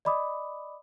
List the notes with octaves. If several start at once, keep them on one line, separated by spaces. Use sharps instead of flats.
D5 D#5 B5 D6 D#6